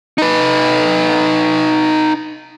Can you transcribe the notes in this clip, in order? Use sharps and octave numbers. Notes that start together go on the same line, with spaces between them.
D#4 B4